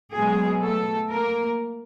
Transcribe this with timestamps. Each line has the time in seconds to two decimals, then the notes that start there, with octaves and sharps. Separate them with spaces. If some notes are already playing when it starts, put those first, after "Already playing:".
0.16 B2 F#3 G#3 G#4
0.63 A3 A4
1.12 A#3 A#4